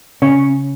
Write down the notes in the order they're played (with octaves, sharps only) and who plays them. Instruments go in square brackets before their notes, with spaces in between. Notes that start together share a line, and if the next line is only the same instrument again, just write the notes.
[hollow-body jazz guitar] C#3 C#4 C#5